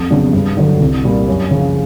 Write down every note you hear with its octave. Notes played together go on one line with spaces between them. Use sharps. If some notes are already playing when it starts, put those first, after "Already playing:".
Already playing: F2
C#3 F#3 B3 D4
G2
D3 F#3
C2
A#2 G3 A#3
F#2
C#3 F3